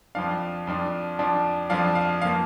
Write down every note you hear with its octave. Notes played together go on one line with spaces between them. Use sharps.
F2 F3 D4 F5
F2 F3 D4
F2 F3 D4
F2 F3 D4 F5
F5
F3 A#3 F5